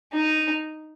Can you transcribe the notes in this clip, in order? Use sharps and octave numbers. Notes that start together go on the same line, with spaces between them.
D#4